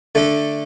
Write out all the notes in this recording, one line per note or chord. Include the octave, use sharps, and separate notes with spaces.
D3 A3 D4 A4